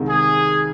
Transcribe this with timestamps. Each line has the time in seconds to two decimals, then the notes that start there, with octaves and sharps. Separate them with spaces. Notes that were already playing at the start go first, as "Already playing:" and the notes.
Already playing: C2 C3 D#3 G#3
0.08 G#4